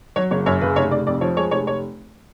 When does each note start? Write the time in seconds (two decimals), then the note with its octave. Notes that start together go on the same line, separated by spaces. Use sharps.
0.16 F#3 C#5
0.31 F#1 C#5
0.46 F#2 C#5
0.61 C#3 B4
0.76 F1 C#5
0.91 F1 D5
1.07 F2 D5
1.21 F3 C#5
1.37 G#3 C#5
1.51 F1 C#5
1.67 C#5